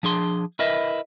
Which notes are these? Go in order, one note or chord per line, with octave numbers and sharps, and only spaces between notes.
F3 D4 G#4 C6
E4 A#4 B4 D#5 E5